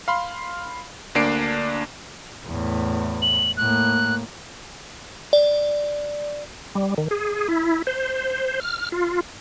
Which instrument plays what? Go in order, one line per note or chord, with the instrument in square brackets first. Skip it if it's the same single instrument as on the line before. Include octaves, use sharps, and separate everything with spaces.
[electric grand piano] F5 B5 C6
D2 A#3 D4 C7 D7
[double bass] E2 A2
[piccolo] F#7
[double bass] A2 A#3 [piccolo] F#6
[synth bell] D5
[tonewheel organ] G3
D#3
G#4
E4
C5
F6
F4